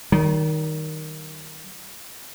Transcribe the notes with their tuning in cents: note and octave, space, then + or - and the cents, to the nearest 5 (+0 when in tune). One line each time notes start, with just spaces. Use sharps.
D#3 +0 G3 -40